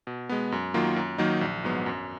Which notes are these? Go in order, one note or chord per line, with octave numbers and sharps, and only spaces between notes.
B2
G#3 B3
F#2
D#3 F#3 A#3 F4
F#2
D#3 F#3 A#3 D#4
A#1
G#2 F#3 B3
F#2